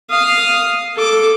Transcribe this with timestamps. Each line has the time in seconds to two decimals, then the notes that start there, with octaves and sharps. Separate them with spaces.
0.10 F5 D#6
0.96 A4 D6